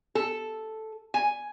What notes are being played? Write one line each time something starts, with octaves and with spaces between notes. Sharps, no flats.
A4
G#5